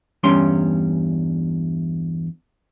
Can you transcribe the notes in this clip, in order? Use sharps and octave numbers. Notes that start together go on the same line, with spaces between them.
E2 G2 G3 C#4 C6